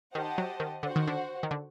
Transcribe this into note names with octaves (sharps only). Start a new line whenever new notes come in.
D#3 G4 C5 D#5 F#5 A5
F#3
D#3
D3 F#4 C5 F#5
D#3
D3
D#3
D3